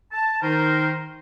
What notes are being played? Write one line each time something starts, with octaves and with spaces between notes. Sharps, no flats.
A5
D#3 D#4 A#4 C5